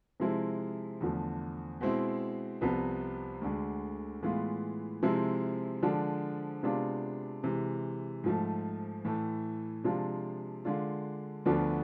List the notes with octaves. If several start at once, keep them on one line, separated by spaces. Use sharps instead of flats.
C3 F3 G#3 C4 E4
E2 D3 F3 A3
B2 G#3 C4 E4
C2 C3 F3 B3
D2 D3 G#3
A2 E3 G#3 B3 F4
C3 F3 G#3 C4 E4
D3 F3 G#3 D4
C3 G#3 B3 D4 F4
C3 E3 G#3
G#2 F3 A3
A2 E3 A3
C3 F3 G#3 D4 F4
D3 G#3 D4 F4
D2 D3 F3 B3 D4